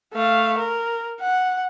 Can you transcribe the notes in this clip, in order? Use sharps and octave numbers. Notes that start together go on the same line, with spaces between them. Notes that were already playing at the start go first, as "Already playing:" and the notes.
A3 F5
A#4
F#5